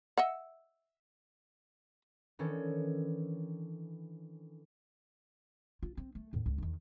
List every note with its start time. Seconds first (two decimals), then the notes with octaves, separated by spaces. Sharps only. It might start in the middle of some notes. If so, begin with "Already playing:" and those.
0.18 D#5 E5 F#5
2.39 D#3 E3 C#4 D4 A4
5.83 F4
5.97 C4
6.15 A3
6.33 D#2 A2
6.46 C#2
6.58 E2 D#3